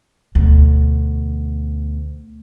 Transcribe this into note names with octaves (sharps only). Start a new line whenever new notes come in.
D2 B2